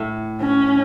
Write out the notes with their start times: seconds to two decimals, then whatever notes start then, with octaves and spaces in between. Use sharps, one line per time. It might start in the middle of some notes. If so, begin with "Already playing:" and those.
Already playing: A2
0.41 C#4